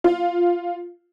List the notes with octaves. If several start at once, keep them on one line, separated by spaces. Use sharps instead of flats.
F4